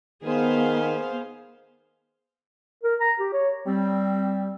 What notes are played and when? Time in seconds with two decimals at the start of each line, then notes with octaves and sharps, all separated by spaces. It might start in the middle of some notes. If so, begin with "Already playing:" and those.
0.23 D#3 B3 G#4 C5 F5
2.83 A#4
3.00 A#5
3.19 G4
3.33 C#5
3.66 G3 C4